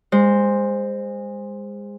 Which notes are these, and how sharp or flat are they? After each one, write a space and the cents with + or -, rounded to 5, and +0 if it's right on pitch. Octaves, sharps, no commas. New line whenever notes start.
G#3 -30 C5 +0